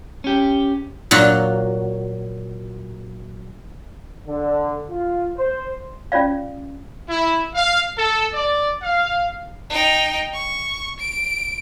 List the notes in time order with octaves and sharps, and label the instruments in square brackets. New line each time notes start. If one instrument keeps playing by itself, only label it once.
[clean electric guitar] C#4 G4
[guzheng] A#2 F#3 F4 F#4
[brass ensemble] D3
F4
C5
[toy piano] C#4 F4 D5 F5
[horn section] E4
F5
A4
D5
F5
[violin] D#4 G5
C#6
D7